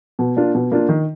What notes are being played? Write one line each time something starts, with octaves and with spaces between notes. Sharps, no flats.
B2
A#3 D4 F4
B2
A#3 D4 F4
D#3